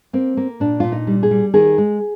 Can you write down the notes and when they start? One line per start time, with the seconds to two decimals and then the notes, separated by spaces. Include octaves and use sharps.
0.13 A#3 C4
0.37 A#3
0.60 A#2 D4
0.80 A#2 F4
0.92 D#4
1.07 G3
1.23 G#4
1.31 G3
1.54 D#3 G#4
1.78 G#3